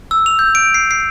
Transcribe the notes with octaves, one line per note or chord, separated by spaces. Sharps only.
E6
F7
G6
D7
C7
C7